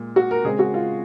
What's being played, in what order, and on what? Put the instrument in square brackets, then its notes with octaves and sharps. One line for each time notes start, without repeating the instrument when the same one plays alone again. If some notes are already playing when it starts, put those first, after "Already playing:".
Already playing: [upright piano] A#2 G#3
F#4
A#4
C#3 G#3 C4 G#4
F#4
F4